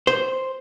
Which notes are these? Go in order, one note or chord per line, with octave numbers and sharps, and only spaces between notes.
C5